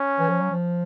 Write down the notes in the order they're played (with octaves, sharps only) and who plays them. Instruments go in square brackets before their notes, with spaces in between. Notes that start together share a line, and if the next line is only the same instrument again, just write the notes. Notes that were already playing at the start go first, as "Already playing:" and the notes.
Already playing: [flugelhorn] C#4
[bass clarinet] E3
F3
F#3
F3